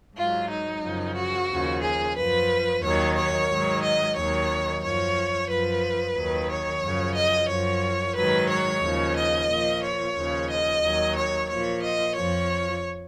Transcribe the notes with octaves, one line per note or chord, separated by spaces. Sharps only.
G#2 F#3 F4
D#4
F#2 C#3 F3
F#4
D#2 C#3 F3
G#4
F#2 F3 B4
D#2 D#3 F#3 C#5
C#5
G#2 D#3 F#3
D#5
D#2 D#3 F#3 C#5
F#2 F3 C#5
F#2 F3 B4
D#2 D#3 F#3
C#5
F#2 C#3 F3
D#5
F#2 F3 C#5
G#2 D#3 F#3 B4
C#5
D#2 C#3 F3
D#5
A#2 F3
C#5
D#2 C#3 F3
D#5
D#2 D#3 F#3
C#5
A#2 F3 C#5
D#5
F2 F3 C#5